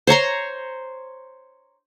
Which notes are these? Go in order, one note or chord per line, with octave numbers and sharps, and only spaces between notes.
C5 C#5 A#5 C6